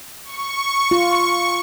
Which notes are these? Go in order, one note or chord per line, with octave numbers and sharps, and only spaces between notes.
C#6
F4